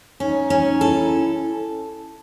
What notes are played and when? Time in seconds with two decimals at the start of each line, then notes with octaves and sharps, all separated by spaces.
0.20 C#4 D#4
0.50 C#4
0.81 E4 A4